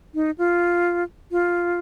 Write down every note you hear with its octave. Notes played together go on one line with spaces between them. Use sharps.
D#4
F4
F4